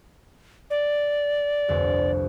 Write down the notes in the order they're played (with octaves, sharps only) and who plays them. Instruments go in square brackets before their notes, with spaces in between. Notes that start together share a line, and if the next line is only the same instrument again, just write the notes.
[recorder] D5
[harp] G1 C2 F2